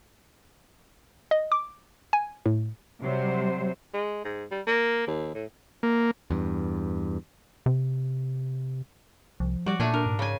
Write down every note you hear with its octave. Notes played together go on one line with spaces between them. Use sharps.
D#5
D6
G#5
A2
C3 F#3 G3 C5
G#3
G#2
G3
A#3
D#2
A2
A#3
E2 G2
C3
C2 F3
G3 F#4 D5
A#2 A3 D4 G#5
D4 A#4
G#2
C#3 G#5